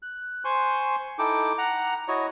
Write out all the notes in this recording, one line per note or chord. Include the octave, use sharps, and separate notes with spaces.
F#6
C5 G#5 C6 C#6
D#4 E4 A4 G5 D6
F#5 A#5
E4 F#4 C#5 D#5